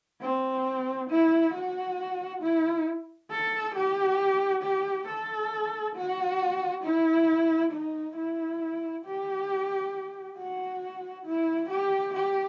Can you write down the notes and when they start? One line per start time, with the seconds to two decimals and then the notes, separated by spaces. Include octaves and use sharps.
0.21 C4
1.10 E4
1.54 F#4
2.42 E4
3.30 A4
3.75 G4
4.63 G4
5.07 A4
5.95 F#4
6.84 E4
7.72 D#4
8.16 E4
9.05 G4
10.38 F#4
11.26 E4
11.69 G4
12.14 G4